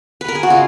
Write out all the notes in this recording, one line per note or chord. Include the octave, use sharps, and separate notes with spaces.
B4
A#4
G#4
F#4
C#3 G#3 C#4 F4